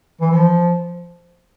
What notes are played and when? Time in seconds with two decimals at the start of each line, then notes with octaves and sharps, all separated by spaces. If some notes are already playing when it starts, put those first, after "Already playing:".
0.21 E3
0.31 F3